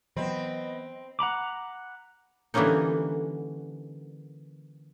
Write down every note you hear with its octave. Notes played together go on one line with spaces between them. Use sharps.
E3 F#3 B3 C4 D#5 B5
F#5 A#5 B5 D6
D3 E3 G3 A#3 C#4 D#4